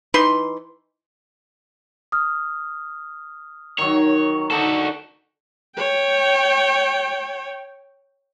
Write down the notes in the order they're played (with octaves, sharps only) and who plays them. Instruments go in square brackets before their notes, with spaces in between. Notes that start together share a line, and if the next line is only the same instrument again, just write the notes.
[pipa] E3 D#4 B4 C6
[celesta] D#6 F6
[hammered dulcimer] D#3 F#3 [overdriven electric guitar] C#5
[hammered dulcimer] D3 D4 D#4 [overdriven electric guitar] F#4 A4
[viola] C#5 G5